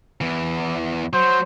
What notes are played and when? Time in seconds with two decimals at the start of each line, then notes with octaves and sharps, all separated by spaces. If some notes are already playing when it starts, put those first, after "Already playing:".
0.21 E2 E3
1.13 F#3 C5